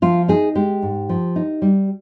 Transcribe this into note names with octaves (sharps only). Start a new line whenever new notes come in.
F3 F4
D#4 G#4
G#3 G4
G#2
F3
D#4
G3